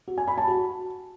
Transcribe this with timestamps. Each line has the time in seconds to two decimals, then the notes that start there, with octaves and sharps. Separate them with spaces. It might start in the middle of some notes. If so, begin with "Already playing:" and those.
0.08 F#4
0.18 G#5
0.28 B5
0.38 A5
0.48 F#4